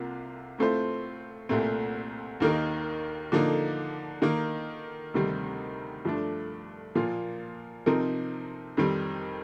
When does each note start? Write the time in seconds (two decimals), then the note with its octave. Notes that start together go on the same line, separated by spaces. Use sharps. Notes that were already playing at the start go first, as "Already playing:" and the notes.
Already playing: C2 C3 A#3 F4
0.58 A2 A3 C4 F4 C5
1.49 C2 A#2 A3 C4
2.40 D#2 D#3 A#3 D#4 A#4
3.32 D3 F3 A#3 D#4
4.22 D#3 A#3 D#4 A#4
5.14 D2 C3 D#3 G3 C4
6.05 G2 F3 A3 D4
6.95 A#2 F3 A#3 F4
7.86 C3 F3 C4 D#4 A#4
8.77 F2 D#3 G3 C4